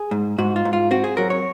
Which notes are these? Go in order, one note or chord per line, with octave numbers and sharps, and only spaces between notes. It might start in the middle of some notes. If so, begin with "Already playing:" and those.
Already playing: G#4
G#2
G#2 F#4
F4
G#2
F4
C4 F#4
G#4
F#3 A#4
C#5